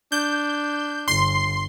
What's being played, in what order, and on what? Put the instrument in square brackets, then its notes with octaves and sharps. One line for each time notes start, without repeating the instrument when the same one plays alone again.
[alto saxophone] D4 [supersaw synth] G6
[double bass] G1 [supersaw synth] C6 C7